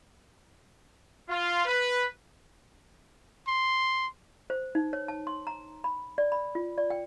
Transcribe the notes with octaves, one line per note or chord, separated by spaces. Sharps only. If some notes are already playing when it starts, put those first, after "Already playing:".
F4
B4
C6
C5
D#4
C#5
A5
C6
A#5
B5
D5
B5
F4
D5
G5